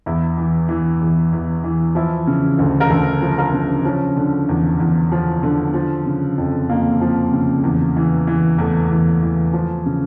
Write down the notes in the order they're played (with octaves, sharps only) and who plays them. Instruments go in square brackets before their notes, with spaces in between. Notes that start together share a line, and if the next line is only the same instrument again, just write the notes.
[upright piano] E2 E4
E3
E3
E2
E2
E3
F3 E4
C#3
D2
A#4
D2 A4
F3
A#4
C#3
F3 C#4
D3
E2
E2
F3
D3
F3
C#3
F2
F2 A#3
F3
C#3
E2
E3
E3
E2 A3
E2
E3
F3
C#3